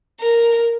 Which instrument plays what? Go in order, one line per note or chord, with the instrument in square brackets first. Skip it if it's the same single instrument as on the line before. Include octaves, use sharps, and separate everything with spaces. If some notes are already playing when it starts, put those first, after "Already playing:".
[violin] A#4